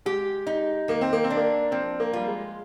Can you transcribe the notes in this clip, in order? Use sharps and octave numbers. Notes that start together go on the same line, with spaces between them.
G#3 G4
D#4
D#3 A#3
C4
A#3
C4
D4
A#3
F3 C4
A#3
G3 F4
G#3